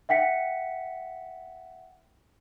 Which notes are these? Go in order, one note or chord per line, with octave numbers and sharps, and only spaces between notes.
E5 F#5 G5 B6 C#7